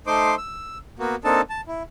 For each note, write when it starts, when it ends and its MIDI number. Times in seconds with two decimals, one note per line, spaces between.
0.07 0.35 57
0.07 0.35 63
0.07 0.35 72
0.07 0.35 84
0.07 0.35 86
0.38 0.78 88
0.99 1.15 58
0.99 1.15 59
0.99 1.15 66
1.24 1.41 58
1.24 1.41 60
1.24 1.41 62
1.24 1.41 63
1.24 1.41 69
1.24 1.41 81
1.50 1.61 81
1.67 1.83 64